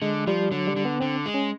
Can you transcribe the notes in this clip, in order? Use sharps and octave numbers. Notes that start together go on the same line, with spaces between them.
D3 G#3
F3 G3
D3 F#3
G3
D3
B3
D3 C4
G#3
C#4